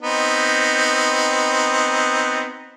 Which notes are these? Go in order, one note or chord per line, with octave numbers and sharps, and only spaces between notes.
B3 C4 D#4